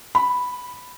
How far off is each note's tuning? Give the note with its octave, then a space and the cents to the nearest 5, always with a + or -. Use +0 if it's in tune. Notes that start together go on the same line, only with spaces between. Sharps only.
B5 +0